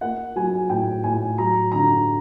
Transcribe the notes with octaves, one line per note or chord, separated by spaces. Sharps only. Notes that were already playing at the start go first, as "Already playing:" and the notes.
A#3 F#5
F#3 G#5
A2 G5
A2 G#5
F#3 A#5
D3 A#5